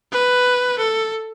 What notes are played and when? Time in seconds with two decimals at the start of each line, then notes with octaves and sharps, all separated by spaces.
0.12 B4
0.78 A4